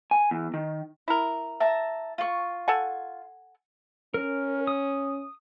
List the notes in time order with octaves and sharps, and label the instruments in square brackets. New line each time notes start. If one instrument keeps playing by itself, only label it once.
[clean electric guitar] G#5
E2
D#3
[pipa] E4 A#4
[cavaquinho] E5 A5 A#5
F4 C#6
[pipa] A4 F#5 G#5
[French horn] C#4 [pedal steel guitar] A#4
[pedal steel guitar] D#6